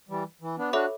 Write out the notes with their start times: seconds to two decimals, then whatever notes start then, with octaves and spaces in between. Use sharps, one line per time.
0.09 E3 G3
0.41 E3
0.58 B3 D4
0.73 D4 F#4 A4 C#5 E5 B5 D6